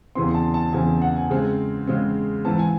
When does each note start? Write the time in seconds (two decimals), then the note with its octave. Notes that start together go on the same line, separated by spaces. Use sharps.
0.15 E2 C#3 E3 C4 C6
0.34 A5
0.54 A5
0.73 E2 C#3 E3 C4 G#5
1.02 F#5
1.16 G#5
1.30 C#3 G#3 C4
1.87 C#3 G#3 C4
2.45 G#2 E3 C4 A5
2.59 G#5